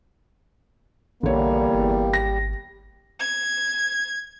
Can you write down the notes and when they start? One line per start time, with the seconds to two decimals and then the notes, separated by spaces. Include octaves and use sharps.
1.23 A#1 E2 D3 G3 A#3 C#5
1.74 G1
2.13 G#1 A#6
3.20 G#6